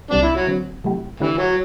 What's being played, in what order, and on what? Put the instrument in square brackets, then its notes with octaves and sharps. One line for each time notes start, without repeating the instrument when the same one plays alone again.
[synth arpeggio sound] C2 C3 G3 C4 [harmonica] D4
[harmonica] E4
F#3
[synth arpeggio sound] D3 F#3 C4
C3 F#3 A3 E4 G4
[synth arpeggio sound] D3 A3 D4 G4 B4 [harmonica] E3
[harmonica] F#3